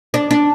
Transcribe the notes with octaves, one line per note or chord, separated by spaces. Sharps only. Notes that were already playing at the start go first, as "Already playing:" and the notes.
D4
D4